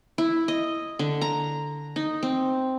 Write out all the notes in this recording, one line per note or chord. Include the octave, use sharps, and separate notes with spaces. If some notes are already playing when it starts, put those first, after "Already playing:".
E4
D#5
D3
A#5
D#4
C4